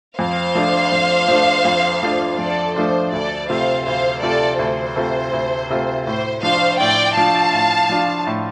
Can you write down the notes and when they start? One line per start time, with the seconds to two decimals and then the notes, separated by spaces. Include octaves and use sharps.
0.19 F2 C5 F5
0.55 F3 A3 D4 F4
0.92 F2
1.28 F3 A3 D4 F4
1.65 F2
2.03 F3 A3 D4 F4
2.39 F2 A4 D5
2.76 F3 A3 D4 F4 C5
3.13 D2 A4 D5
3.49 C3 A3 F4 C5 F5
3.86 D2 C5 F5
4.22 C3 A3 F4 A4 D5
4.59 D2 C5
4.96 C3 A3 F4
5.33 D2
5.70 C3 A3 F4
6.06 A2 C5
6.43 F3 D4 F4 C5 F5
6.80 A2 D5 G5
7.17 F3 D4 F4 F5 A5
7.53 A2
7.89 F3 D4 F4
8.27 A2